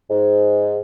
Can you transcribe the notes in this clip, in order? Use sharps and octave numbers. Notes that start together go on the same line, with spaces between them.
G#2